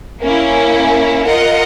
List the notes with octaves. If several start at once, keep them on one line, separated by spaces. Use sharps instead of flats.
A#3 C#4 E4
F4 A#4 D#5 F#5